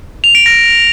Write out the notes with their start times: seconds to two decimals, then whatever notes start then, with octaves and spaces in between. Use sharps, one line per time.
0.24 F7
0.35 D7
0.46 A#6